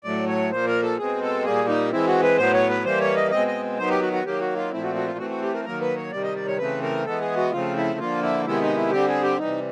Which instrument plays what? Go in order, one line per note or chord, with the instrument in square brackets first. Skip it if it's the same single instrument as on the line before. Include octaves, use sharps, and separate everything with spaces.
[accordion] A2 F#3 A3 D5
C#5
A#2 F3 A#3 C5
A#4
A4
B2 G#3 C4 G#4
A4
A#2 G3 A#3 G#4
D#4
E3 G#3 C4 E4
F#4
B4
A2 F#3 B3 C5
C#5
B4
E3 G3 A#3 C5
C#5
D#5
B2 G#3 C4 D#5
D#5
D#3 F#3 B3 C5
G4
F#4
F#4
D#3 F#3 A#3 G4
F#4
F4
A#2 F3 A3 C4 E4
F#4
F#4
F4
E3 A3 C4 F#4
F#4
G4
A#4
D#3 F#3 A#3 A#4
B4
C#5
C3 D#3 G3 D5
D#5
D5
C#5
C#3 E3 A3 C4 B4
A#4
E3 G#3 B3 A4
G#4
F#4
C#3 F3 A3 C4 F4
E4
D3 F3 A#3 F4
E4
C3 D#3 G#3 B3 E4
D#4
E4
D3 G3 C4 G4
G#4
G4
C3 E3 G3 D#4